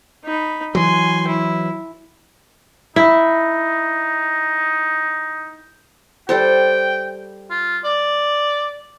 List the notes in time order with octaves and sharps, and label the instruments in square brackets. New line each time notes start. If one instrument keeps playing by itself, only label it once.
[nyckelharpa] D#4 B5
[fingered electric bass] E3 F#3 [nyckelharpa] G#5 C6
[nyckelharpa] E4
[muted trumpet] D#4 [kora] E4
[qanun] G3 A4 C5 [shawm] G5
[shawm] F4
D5